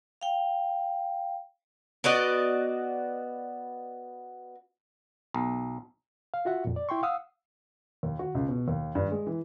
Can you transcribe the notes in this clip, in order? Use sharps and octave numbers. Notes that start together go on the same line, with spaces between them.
F5 G5
B3 F#4 D5 D#5
B1
F5
F4 F#4 E5 F#5
F2 A#2
D5
E4 G5 C6 C#6
F5 F#5 D#6 E6
D#2
F#4
C#2
B2
D#2
G2
G#3
E3